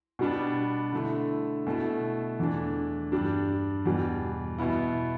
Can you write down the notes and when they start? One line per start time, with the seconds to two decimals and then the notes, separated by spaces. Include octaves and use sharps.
0.19 B2 G3 B3 D4
0.92 D3 A3 E4
1.67 B2 A3 E4
2.39 E2 E3 A3 D4
3.12 G2 G3 D4
3.86 E2 B2 G3
4.58 B2 B3 E4